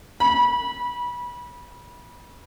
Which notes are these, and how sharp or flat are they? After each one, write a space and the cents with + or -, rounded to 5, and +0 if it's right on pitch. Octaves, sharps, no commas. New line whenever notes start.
B5 -25